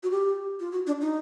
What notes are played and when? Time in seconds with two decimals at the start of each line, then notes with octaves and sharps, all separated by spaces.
0.03 F#4
0.11 G4
0.60 F4
0.72 F#4
0.87 D4
1.01 D#4